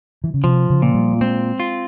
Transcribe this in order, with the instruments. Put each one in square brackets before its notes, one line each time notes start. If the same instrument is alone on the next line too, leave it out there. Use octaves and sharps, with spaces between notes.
[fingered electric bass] E3
C#3
[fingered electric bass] C3 [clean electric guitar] F3
[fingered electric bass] C#3
[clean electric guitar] A#2
[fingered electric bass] G3
A#3
[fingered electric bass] G#3 [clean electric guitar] C4
[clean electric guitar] F4